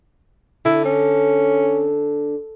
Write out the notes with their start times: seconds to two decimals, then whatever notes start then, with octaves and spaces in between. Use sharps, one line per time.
0.65 D3 E4
0.85 C#4